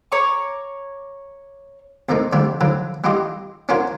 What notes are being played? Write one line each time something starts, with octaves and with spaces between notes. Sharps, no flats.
C#5 A#5 C#6 D6
F2 F3 A3 A#3 D#4
D3 F3 G3 A3 D4
D3 F3 F#3
G3 D4 F4 G4 D#5
C#4 D4 F4 F#4 A#4 C#5